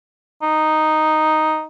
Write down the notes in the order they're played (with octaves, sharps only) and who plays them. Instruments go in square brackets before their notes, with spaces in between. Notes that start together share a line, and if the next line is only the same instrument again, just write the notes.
[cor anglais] D#4